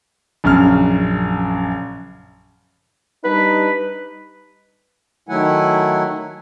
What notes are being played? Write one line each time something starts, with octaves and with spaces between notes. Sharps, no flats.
A#1 F#2 C#3 F6
G3 D4 D#4 B4
D#3 F#3 A3 E4 F#5 G#5